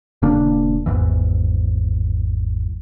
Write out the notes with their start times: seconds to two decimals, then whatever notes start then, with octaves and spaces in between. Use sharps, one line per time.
0.22 D#1 C#3 A#3 D4
0.86 G#1 E2 G#2 E3